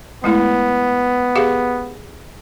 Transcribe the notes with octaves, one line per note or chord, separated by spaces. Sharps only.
G#3 A3 B3 E4
G4 G#4 F5